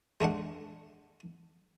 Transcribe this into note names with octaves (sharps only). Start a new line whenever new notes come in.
G#3 A3 D4 F#5